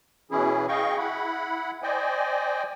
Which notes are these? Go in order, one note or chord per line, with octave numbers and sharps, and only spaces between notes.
B2 E3 C#4 E4 G#4
G#4 D#5 F5 G5 C#6
E4 F#5 B5
C5 D5 D#5 G5 G#5